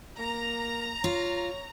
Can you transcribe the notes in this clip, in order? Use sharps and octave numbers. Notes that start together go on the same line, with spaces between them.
A#3 A#5
F4 C#5